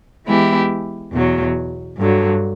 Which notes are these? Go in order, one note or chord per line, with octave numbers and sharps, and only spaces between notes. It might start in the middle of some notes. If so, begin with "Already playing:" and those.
E3 G#3 B3 E4 G4
E2 B2 F#3
G2 D3 F#3